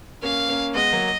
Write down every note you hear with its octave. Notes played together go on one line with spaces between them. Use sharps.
A#3 C#4 F5
A#3 C#4
G#3 B3 D#5
F#3 A#3